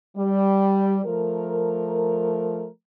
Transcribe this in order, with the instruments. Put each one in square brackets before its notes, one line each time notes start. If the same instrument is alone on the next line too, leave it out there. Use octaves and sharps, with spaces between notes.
[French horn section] G3
F3 A3 A#4